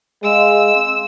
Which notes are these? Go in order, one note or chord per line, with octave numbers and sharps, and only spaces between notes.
G#3 D#5 F5 E6
C4